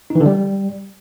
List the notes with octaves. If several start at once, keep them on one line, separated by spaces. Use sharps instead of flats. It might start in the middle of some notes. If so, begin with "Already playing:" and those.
D#4
E3
D3
G3